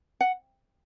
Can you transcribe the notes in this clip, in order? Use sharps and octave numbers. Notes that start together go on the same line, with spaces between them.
F#5